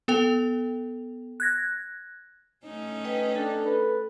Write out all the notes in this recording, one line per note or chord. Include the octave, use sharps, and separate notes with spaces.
B3 A4 G5 F7
F#6 G#6 A#6
A3 C#4 D#4
B4 D#5 G5
D4 A4
B4